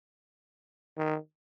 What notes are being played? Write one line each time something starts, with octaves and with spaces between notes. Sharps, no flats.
D#3